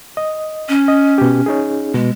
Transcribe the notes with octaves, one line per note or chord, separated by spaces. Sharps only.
D#5
C#4
D#5
B2 G4
C#4 D#4 G#4
B2 G#3